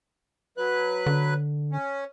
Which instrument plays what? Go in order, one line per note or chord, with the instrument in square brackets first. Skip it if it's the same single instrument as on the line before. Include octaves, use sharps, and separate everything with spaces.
[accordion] F#3 B4 F#6
[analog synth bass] D3
[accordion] C#4